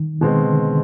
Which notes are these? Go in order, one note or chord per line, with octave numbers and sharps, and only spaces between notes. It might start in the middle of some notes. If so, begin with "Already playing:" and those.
Already playing: D#3
B2 D#3 G#3 C4
D3